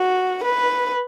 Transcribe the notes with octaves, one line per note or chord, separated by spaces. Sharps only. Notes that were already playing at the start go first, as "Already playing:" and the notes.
Already playing: F#4
B4